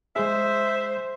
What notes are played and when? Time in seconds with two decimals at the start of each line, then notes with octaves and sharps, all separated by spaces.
0.16 G#3 G#4 C5 E5